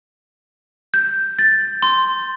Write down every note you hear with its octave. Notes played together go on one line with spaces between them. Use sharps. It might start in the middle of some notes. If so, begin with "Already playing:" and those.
G6
A6
C6